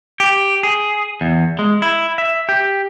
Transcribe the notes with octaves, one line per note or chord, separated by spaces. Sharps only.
G4
G#4
E2
G#3
E4
E5
G4